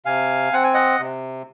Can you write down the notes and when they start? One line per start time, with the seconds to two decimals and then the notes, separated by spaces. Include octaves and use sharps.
0.05 C3 F5 G#5
0.53 C4 F#5
0.64 G#5
0.74 D#5 F#5
1.00 C3